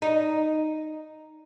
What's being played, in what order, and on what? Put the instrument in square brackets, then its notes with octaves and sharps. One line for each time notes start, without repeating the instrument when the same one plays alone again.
[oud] D#4